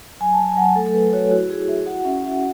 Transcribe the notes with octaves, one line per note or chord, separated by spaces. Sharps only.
F#3 G#5
A5
F#3
G#5
F#3 F#5
G#5
A3 A4
A4
A3 B4
F#4 C#5
E4 F#4
E4 G#4
E4 E5
F#4 F#5
F#5
C#4 E5
F#4 E5
F#5